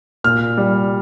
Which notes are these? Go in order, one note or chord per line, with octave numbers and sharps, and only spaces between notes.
A#2 F6
G3